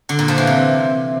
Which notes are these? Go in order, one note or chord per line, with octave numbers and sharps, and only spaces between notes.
D3
A#2
F3
E3
C3